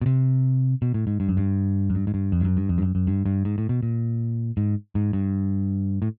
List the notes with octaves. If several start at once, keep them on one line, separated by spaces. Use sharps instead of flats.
B2
C3
B2
A2
G#2
G2
F#2
G2
F#2
G2
G#2
G2
F2
G2
F#2
G2
F2
G2
F#2
F#2
G2
G2
G#2
A2
B2
A#2
G#2
G#2
G2
A2